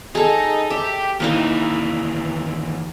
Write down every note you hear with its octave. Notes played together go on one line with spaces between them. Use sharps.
D#4 G#4 A4
G4 E5
D#2 E3 A#3 D#4 E4